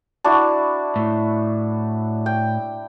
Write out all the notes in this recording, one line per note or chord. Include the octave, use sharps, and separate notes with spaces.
D4 E4 F#4
A2
G5